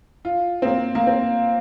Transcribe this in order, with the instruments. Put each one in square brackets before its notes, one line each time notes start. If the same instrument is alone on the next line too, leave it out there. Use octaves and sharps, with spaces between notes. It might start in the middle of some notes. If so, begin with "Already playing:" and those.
[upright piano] F4
C4
A#3
A#3
C4